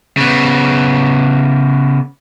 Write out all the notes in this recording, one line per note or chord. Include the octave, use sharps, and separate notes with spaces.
C#3 B3